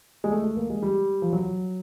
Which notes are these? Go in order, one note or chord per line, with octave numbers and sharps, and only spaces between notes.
G#3
A3
A3
A#3
G#3
G3
F3
F#3